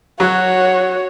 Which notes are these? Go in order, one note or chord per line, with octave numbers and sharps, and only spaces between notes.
F#3 F#4 C#5